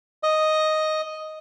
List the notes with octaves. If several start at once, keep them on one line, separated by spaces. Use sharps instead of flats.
D#5